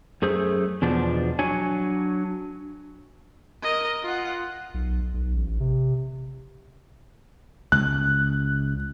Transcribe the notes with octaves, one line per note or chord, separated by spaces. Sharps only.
F#2 A3 G#4 C5
E2 B2 F3 D4
F#3 D4 C#5 G#5
A#4 D#5
F4 F#5
B1
B1
A1
C3
C#2 F#6